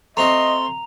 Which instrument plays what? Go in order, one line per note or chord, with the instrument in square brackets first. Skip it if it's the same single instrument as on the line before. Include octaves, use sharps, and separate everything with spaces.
[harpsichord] A3 C4 F#4 [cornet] D#5 [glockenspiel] A#5 F7 [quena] C6